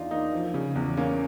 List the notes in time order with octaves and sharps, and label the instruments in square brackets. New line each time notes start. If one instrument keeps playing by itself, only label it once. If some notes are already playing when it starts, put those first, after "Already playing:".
Already playing: [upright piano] E2 [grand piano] D4 D#4 F4
[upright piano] A#3 [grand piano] D#4
[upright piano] F3
C#3
E2
[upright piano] A#3 [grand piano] C#4